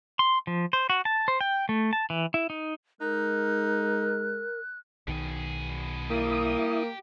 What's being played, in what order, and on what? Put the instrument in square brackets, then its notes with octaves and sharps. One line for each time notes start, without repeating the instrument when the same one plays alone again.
[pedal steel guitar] C6
F3
C5
F#4
A5
C5
G5
A3
A5
E3
E4
D#4
[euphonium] G#3 [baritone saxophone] D#4 [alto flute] A#4 [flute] F#6
[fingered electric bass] B1 D#3 [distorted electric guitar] B2 G#4
[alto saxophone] A#3 [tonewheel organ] E4 D#6 [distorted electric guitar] G4 D5